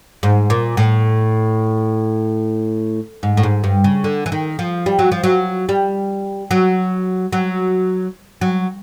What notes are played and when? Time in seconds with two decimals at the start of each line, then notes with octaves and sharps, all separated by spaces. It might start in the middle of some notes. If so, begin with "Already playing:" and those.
0.23 G#2
0.50 A#2
0.77 A2
3.23 G#2
3.37 A2
3.43 G#2
3.64 G2
3.84 C#3
4.04 D3
4.26 E3
4.32 D#3
4.59 F3
4.86 G3
4.99 F#3
5.12 F3
5.24 F#3
5.69 G3
6.51 F#3
7.33 F#3
8.41 F#3